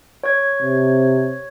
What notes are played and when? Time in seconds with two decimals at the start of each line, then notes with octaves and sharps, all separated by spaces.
0.24 C#5 G#6
0.62 C3